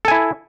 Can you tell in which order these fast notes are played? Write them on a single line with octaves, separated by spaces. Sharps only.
A4 G#5 E4